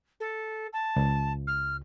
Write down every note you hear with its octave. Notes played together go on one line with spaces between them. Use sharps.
A4
A5
C#2
F6